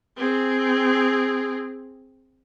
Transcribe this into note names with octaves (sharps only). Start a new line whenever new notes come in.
C4 G#4